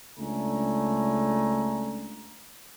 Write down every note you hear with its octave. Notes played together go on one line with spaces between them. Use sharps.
C#2 A3 D4 G#5 A#5